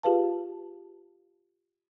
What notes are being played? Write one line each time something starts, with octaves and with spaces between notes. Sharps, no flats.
F4 G4 G#4 B4 F5 A5